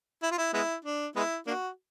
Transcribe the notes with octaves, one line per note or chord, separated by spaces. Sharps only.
E4
F4
E4
G#3 B3 E4
D4
G#3 B3 E4
A#3 D4 F#4